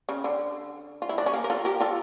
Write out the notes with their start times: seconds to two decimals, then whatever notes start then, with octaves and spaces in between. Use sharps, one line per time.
0.09 C#3
0.24 D3
1.02 F4
1.09 E4
1.18 D4
1.26 C#4
1.34 A#3
1.44 A#4
1.50 F4 A4
1.65 G4 A#4
1.80 F4 A4